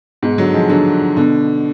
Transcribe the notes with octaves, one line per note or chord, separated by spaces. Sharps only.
G#2 B2
D3 F#3
F3 G#3
D3 F#3
B2 D3